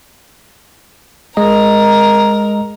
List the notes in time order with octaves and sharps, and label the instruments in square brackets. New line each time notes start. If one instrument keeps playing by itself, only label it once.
[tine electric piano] G#3 D#5 [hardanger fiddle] A#4 A#5